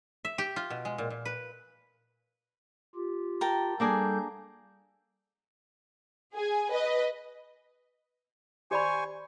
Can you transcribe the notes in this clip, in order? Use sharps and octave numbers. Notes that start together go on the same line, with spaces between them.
E5
G4
F4
B2
G#3
A#2
A#2
B4
F4 G4
A#4 G5 A5
G3 A#3 D4 G#4 A4 G6
G#4 G#5
B4 D#5
G4 C5 D5 G#5 B5 C#6